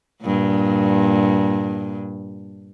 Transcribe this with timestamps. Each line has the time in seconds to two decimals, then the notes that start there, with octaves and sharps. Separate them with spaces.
0.22 G2 A#2